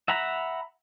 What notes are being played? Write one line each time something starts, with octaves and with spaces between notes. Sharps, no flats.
E5 F#5 A#5 B5